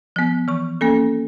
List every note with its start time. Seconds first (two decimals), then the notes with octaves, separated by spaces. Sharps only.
0.16 F3 B3
0.48 E3 C#6
0.81 A#3 C#4 A4